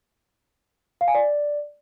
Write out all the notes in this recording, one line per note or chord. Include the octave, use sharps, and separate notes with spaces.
F5
G#5
D5